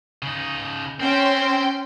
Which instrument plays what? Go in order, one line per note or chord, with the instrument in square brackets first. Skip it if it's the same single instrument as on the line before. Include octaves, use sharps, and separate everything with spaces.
[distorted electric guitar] C#3 D#4
[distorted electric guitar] C4 [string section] C#4 G5 C6